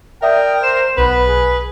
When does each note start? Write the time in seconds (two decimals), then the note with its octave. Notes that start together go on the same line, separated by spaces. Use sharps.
0.22 A#4 D5 E5 G5 D#6
0.63 C5 C7 E7
0.97 B1 B3 B4
1.28 G#4